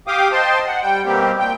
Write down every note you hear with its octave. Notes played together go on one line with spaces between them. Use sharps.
G4 F5 G5 D6 D#6
C5 D#5 G5 A5 C6
F#5
G3 G5
B2 G3 A#3 C4 G4
A#2 G5